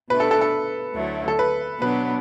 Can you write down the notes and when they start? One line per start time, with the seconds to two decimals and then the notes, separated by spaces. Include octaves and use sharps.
0.10 B2 A3 D4 B4
0.20 A4
0.31 A4
0.41 A4
0.95 D2 D3 F#3 A3 E4
1.28 A4
1.39 B4
1.81 B2 F#3 B3 D4 B4